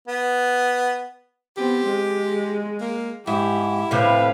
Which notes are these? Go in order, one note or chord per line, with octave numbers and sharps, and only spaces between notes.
B3
B3 C4 G4
G#3
A#3
G#2 E4 G4
A2 C3 B4 F5